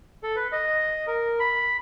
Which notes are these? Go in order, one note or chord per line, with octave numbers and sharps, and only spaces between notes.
A4
B4
D#5
A#4
B5